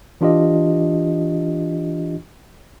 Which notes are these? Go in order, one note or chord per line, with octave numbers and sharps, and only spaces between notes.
E3 D4 F4 G4 D#5